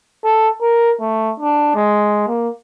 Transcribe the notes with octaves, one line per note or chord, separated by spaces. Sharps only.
A4
A#4
A3
D4
G#3
A#3